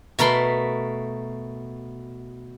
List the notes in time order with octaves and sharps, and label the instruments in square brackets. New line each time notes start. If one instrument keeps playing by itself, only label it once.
[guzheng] B2 A3 A#4 B5 C6